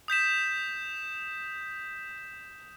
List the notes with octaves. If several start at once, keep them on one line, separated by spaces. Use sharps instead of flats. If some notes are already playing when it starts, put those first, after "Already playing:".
D#6 G6 B6 E7